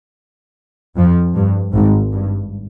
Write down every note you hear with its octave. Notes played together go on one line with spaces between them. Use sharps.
F2 F3
G2
G#1 G#2
G2